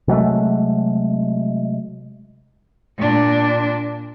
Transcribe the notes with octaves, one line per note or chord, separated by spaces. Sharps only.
C3 F#3 G#3 A3
A#2 D4